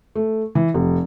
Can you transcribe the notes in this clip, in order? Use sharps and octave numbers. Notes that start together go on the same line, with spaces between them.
A3
E3
F1